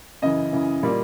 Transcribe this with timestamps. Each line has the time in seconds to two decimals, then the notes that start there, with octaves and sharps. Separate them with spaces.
0.22 F#2 C#3 E3 D#5
0.53 F#2 C#3 E3
0.82 A#2 G3 A#3